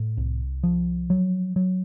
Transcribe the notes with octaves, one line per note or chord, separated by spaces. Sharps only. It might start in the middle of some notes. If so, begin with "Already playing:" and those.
Already playing: A2
C2
F3
F#3
F#3